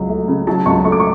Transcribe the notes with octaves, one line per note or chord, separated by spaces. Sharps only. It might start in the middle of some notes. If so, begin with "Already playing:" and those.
Already playing: C#2 F#3
A3
C#3
F#3 A5
C#2 C#6
A3 C#6
D6
C#6